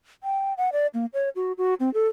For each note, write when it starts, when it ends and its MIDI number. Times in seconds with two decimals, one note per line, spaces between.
0.24 0.53 79
0.57 0.70 78
0.73 0.87 74
0.94 1.06 58
1.14 1.29 73
1.36 1.52 66
1.58 1.74 66
1.80 1.92 60
1.94 2.08 69